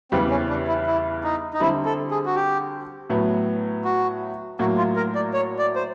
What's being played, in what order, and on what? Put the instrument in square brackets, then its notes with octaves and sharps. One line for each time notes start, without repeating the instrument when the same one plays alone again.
[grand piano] E2 C#3 E3 G3 [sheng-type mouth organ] C4
[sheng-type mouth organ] C#4
D4
E4
E4
D#4
D#4
[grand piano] D3 G3 C4 [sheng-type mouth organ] E4
[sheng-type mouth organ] A4
G#4
F#4
G4
[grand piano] A2 F#3 B3
[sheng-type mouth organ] F#4
[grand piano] A2 F#3 A#3 [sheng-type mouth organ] F#4
[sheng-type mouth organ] F4
A#4
D5
C#5
D5
C5